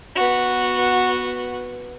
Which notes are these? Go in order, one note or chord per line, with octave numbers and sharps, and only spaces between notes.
B3 F#4